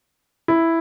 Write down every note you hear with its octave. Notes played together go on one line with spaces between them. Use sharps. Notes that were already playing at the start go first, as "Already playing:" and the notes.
E4